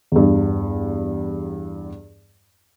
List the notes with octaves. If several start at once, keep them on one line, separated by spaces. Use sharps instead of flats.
E2 G2